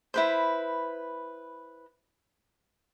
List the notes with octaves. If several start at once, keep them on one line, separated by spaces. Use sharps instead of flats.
E4 B4 C5